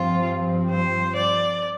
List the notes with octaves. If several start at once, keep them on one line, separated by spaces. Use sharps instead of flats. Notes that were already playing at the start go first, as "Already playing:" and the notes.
Already playing: G2 F3 C4 F4
C5
D5